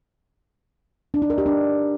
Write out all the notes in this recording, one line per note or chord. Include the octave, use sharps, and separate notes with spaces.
D4
D#4
A#4
G4
D4